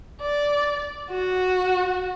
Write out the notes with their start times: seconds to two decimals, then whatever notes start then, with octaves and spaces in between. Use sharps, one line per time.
0.21 D5
1.10 F#4